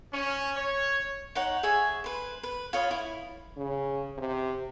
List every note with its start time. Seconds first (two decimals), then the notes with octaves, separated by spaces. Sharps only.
0.13 C#4
0.57 C#5
1.35 D#4 C#5 F#5
1.63 G#4 E5 G#5 C#6
2.04 B4 C5
2.43 B4
2.73 F4 C#5 D#5 B5
2.91 E4
3.57 C#3
4.18 C3